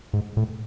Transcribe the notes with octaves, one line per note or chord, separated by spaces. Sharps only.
G#2
A2